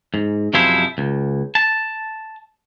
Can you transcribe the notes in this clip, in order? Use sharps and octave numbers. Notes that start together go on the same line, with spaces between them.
G#2
F#2 C3 F3 G#3 E4 C5
C#2
A5